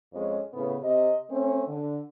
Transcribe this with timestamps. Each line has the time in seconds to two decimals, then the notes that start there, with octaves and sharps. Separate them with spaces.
0.13 F2 G#3 C#4
0.53 A2 C#3 B3
0.82 C3 D#5
1.29 A3 C4 C#4
1.67 D3